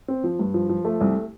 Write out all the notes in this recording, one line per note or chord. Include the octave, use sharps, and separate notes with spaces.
C4
F3
G2
F3
F3
A3
C2